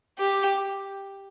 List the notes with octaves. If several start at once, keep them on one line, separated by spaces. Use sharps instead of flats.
G4